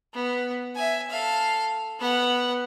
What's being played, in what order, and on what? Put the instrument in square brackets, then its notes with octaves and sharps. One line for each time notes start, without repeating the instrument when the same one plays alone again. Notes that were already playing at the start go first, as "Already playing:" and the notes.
[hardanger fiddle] B3
E5 G#5
A4 F5
B3 F#5